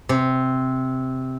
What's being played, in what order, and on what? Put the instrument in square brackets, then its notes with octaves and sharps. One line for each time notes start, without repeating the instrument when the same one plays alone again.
[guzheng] C3